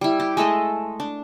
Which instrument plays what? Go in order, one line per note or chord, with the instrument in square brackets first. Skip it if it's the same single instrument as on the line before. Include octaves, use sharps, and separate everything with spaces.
[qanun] G3 E4
G4
G#3 A3 A4 D#5
D4